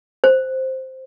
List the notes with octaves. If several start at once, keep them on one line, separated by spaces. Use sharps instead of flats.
C5